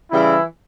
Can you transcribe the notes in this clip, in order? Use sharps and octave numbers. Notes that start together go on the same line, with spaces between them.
C#3 E3 G3 E4